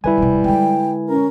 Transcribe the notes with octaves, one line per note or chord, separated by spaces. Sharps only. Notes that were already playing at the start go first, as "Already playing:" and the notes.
D3 G3 E4 B4 G#5
D1 C3
D3 G#3 G5
C#4 A#4